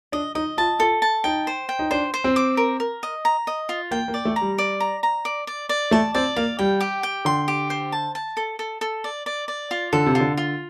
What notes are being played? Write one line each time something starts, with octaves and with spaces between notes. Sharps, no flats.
D4 D#5
D#4 D#5
F4 A5
F4 A4
A5
D#4 G5
C5
G5
D#4
D4 C5
C5
C4
D6
A#4
A#4
D#5
A#5
D#5
F4
A#3 G5
A#3
D5
A3
A#5
G3
D5
A#5
A#5
D5
D5
D5
A3 A5
C4 D5
A#3 F5
G3 G5
G4
G5
D3 C6
G4
C5
A5
A5
A4
A4
A4
D5
D5
D5
F4
D3 A4
C3
F4
D3
F4